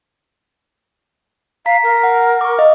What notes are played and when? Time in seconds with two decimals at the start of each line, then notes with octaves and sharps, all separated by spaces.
1.66 F5 A#5 B6
1.83 A#4
2.03 F#5
2.41 C#6 D6
2.58 D#5 F5